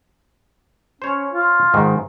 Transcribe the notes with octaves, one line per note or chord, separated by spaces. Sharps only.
C#4 C5 C#5
F4
G#2 D#3